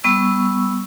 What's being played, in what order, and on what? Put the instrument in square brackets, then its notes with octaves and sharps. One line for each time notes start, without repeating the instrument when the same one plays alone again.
[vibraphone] G3 B3 C#6 E6